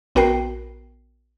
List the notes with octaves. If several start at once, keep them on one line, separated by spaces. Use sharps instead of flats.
A#1 B3 F#4 A#4 G5 C7